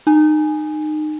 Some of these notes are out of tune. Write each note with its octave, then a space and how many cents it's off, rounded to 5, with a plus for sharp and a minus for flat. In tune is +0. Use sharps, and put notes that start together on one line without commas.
D#4 -25 G#5 +0